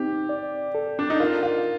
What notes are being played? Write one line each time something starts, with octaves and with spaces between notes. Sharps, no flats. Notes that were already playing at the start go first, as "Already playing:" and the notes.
Already playing: C4 D#4 G4
D5
A4
D4
D#4
F4 A#4
F4